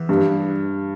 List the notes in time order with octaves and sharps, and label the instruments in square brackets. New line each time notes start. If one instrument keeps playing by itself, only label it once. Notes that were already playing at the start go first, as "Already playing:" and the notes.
Already playing: [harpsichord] E2 E3
[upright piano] G2